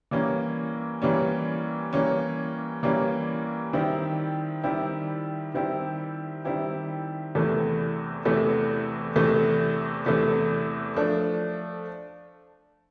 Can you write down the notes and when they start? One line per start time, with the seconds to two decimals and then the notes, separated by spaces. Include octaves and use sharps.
0.11 E3 G3 A#3 C#4
1.02 E3 G3 A#3 C#4
1.93 E3 G3 A#3 C#4
2.83 E3 G3 A#3 C#4
3.73 D#3 G3 C4 E4 G4
4.64 D#3 G3 C4 E4 G4
5.54 D#3 G3 C4 E4 G4
6.45 D#3 G3 C4 E4 G4
7.35 E2 C3 E3 A3
8.25 E2 C3 E3 A3
9.16 E2 C3 E3 A3
10.06 E2 C3 E3 A3
10.96 F3 A3 D4